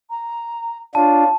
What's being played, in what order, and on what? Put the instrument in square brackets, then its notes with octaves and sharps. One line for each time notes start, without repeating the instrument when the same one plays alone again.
[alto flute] A#5
[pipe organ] D4 F4 [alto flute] C#5 [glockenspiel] A5